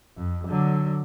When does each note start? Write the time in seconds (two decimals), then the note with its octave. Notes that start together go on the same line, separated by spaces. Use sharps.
0.17 F2
0.48 D3 F#3